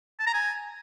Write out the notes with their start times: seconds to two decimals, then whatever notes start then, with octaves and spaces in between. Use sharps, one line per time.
0.20 A5
0.27 A#5
0.34 G#5